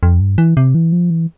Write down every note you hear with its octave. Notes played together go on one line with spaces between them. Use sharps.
F2
G2
E3
C3
E3
F3
E3